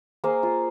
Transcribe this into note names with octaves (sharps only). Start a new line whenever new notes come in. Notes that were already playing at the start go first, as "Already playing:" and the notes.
A#3 G#4 C5
F4